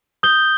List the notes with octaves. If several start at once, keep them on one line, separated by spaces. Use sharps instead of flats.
D#6 G6 G7